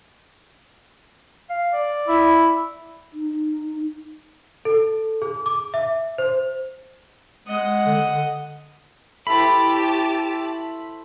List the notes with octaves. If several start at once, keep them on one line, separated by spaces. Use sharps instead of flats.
F5
D5
E4
D#4
A4
G#4
D6
E5
C5
G#3 D#5 F#5
D3
A3 E4 G4 C5 A5 B5